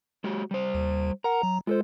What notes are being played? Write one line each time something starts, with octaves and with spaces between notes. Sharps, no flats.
G#3 F#4 G4
G3 C5
D#2
A#4 F#5 A#5
F#3
G#3 F4 A4 C5